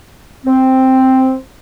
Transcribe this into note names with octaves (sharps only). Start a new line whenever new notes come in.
C4